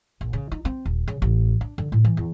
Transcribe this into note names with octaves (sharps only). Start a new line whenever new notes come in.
A#1
C#3
D#4
C4
D#1
C#3
A1
D4
D3
A2
E3
E2